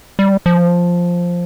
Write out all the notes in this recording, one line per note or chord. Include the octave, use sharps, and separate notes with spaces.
G3
F3